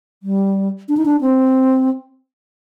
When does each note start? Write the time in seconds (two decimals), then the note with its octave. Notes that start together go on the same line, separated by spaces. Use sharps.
0.23 G3
0.89 D4
0.97 D#4
1.06 D4
1.21 C4